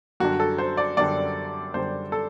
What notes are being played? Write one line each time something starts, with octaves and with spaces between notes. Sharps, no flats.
F#2 D3 G3 D4 F#4
A4
C5
D5
F#2 D3 G3 D4 D5
F#2 D3 G3 D4 C5
A4